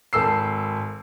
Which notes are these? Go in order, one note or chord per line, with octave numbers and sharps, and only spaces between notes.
G#1 A4 E6 C7